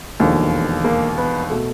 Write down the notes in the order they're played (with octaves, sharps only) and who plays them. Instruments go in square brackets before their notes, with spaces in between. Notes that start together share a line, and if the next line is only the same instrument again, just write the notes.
[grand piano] E1 D#2 D3 F3
A#3
B3
B2 A3